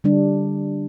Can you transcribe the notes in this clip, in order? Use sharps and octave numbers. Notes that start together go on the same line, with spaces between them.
D3 G3 D4